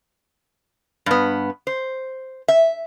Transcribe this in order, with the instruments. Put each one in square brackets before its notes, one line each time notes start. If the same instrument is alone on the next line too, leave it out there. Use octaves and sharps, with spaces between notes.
[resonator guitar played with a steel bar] G2 B3
C5
E5